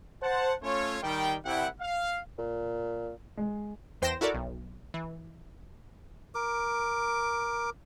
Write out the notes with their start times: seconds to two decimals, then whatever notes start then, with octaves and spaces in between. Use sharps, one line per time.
0.22 C5 F#5 A5
0.63 A3 C#4 F4 C#5
1.03 D#3 G3 G5
1.45 C2 E4 F#5 G5
1.81 F5
2.38 A#2
3.37 G#3
4.02 E2 C5 G5 C6 A#6 E7
4.21 E4 F#4 A4 A#4 D5
4.34 B1
4.94 E3
6.35 A#4 D6